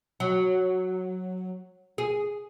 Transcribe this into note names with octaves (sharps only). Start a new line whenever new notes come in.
F#3
G#4